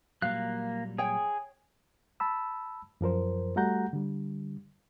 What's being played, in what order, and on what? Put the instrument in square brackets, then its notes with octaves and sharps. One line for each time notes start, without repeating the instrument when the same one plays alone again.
[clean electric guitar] A#2 F#3 G3 [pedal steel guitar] A#3 F#6 [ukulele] F5
[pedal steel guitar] G#4 [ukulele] C#5 G5
[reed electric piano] A5 B5 E6
F#2 F3 A#4 C5
G3 A3 F#4 F#5 A#5 G6
D3 G3